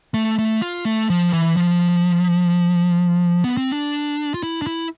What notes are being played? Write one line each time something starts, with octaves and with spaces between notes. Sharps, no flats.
A3
A3
F4
A3
F3
E3
F3
B3
C4
D4
F4
E4
D4
E4